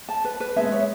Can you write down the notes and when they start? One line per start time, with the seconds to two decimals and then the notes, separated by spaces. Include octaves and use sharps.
0.09 A5
0.25 B4
0.40 B4
0.56 G#3 B3 E5
0.72 C#5